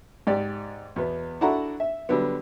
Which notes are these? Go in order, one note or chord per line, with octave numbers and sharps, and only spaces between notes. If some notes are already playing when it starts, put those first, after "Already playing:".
G#2 G4 D5
E2 B2 B3
D4 E4 F#4 A4 F#5 A#5
E5
D3 F#3 G3 B3